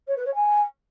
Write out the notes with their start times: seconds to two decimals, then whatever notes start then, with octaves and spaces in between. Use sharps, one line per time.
0.07 C#5
0.16 B4
0.25 C#5
0.34 G#5